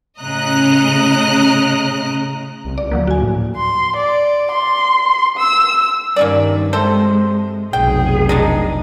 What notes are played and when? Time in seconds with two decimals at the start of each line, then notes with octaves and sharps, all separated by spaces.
0.19 A2 C#3 D#5 A#5 F#6
2.65 C2
2.78 C#2 D5
2.91 D2 F3 F#3 A#3
3.07 D2 F#4 G#5
3.21 A2
3.56 C6
3.96 D5
4.52 C6
5.37 E6
6.16 G2 D#3 A#3 C#4 D5
6.73 C3 G#3 A4 C5
7.73 F1 B1 G#4 G5
8.29 G#3 D4 D#4